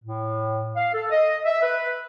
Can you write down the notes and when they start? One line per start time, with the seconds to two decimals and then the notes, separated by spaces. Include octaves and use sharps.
0.04 A2
0.76 F5
0.93 A4
1.10 D#5
1.45 E5
1.62 B4